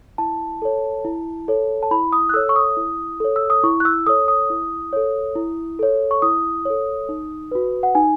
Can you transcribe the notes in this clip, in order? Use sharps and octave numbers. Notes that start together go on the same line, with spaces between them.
E4 A5
A4 C#5
E4
A4 C#5
A5
E4 B5
D#6
F#6
A4 C#5 E6
C#6
D#6
E4
A4 C#5
E6
D#6
E4 C#6
F#6
E6
A4 C#5 D#6
D#6
E4
A4 C#5
E4
A4 C#5
C#6
E4 D#6
A4 C#5
D#4
F#4 B4
F#5
D#4 G#5